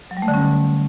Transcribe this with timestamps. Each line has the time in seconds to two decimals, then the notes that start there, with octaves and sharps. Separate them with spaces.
0.11 F#3
0.17 G3
0.22 A3
0.28 D3
0.34 C#4